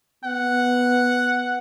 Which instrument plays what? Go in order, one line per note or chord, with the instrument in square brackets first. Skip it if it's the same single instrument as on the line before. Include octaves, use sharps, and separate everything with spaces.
[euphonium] B3 [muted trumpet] F#5